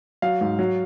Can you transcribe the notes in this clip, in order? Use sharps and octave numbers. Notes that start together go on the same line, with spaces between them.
F#3 F5
G#2
F#3